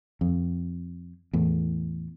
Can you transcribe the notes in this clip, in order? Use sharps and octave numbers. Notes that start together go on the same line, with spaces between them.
F2
E2 A2